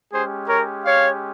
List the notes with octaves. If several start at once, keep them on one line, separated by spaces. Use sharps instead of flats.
G#3 C#4 G4 G#4 C5
A#4 C#5
C#5 F5